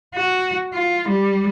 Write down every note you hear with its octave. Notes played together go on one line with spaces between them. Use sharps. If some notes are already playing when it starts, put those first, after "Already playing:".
F#4
F4
G3